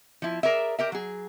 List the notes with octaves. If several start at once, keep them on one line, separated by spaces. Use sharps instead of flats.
F3 E4
G#4 A#4 D5 E5
G4 A#4 E5
F#3 G#4